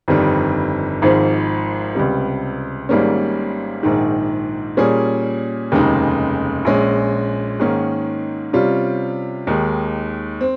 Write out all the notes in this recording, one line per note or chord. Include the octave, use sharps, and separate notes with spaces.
G1 F2 D#3 G3
G#1 G#2 F3
C#2 C3 G3
G#1 G#2 G3 A#3 C#4
A#1 G#2 D#3
A#2 G3 A#3 C#4 G#4
F1 D#2 C#3 G#3 D#4
A#1 A#2 G#3 C#4
G#2 D#3 A#3 C#4
C3 G3 C#4 F4
D#2 D#3 G#3
C4